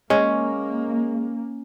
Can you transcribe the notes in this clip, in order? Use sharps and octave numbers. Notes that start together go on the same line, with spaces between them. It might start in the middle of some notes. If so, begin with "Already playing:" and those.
G#3 A#3 C#4